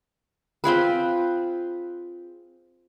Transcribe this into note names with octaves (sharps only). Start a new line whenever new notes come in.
C4 F4 G#4 B4